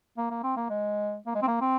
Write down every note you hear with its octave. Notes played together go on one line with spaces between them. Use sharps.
A#3
A#3
C4
A#3
G#3
A#3
G#3
C4
A#3
C4